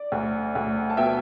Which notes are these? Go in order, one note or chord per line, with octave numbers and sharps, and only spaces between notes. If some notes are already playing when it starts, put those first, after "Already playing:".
Already playing: D5
D2
D2
A5
B2 E5 G5